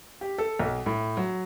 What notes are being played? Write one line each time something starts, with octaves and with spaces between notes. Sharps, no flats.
G4
A4
B1
A2
F#3